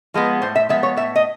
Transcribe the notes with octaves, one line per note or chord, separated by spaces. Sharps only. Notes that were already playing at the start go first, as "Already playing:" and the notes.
F3 G#3 B3
A2 C5
E5
F3 G#3 B3 E5
C#5
A2 E5
D#5